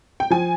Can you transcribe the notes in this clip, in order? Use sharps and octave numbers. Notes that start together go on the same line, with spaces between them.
G5
F3 G#5